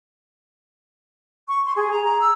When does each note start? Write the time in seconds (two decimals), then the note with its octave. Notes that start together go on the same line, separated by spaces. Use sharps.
1.48 C#6
1.64 C6
1.76 G#4
1.91 A#5
2.05 A#5
2.20 E6